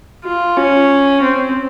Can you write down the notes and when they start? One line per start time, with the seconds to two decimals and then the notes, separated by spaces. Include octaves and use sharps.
0.25 F4
0.57 C#4
1.22 C4